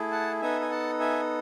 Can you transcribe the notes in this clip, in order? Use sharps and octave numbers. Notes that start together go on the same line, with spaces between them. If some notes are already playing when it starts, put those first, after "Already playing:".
Already playing: A3 E4 G#4
F#5 A5
B3 D#4 A4 E5 G#5
G#5
F#5 A5
E5 G#5